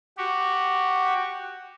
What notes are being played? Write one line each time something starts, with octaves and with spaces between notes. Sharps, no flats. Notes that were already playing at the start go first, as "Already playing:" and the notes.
F#4 G4